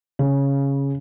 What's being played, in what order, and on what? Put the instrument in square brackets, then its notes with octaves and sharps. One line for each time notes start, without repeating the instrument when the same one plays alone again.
[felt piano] C#3